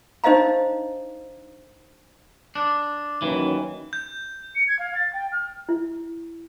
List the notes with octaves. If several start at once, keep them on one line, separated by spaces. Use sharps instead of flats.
D4 D#4 C5 D#5 F5 A#5
D4
D#2 D#3 E3 F#3 C#4
G6
C#7
G#6
F5
A6
G5
F6
E4